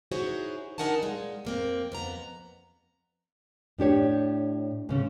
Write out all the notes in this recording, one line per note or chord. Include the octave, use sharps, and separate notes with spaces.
D#4 E4 F#4 G#4 C5 C#5
D4 D#4 A#4 F#5 G#5 A5
A#2 G#3
F2 A#3 C4
F2 B3 A#5
A2 D4 G4 C#5
G#2 C#3 C#4